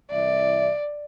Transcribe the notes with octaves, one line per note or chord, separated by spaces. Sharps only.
C2 E3 D5 E5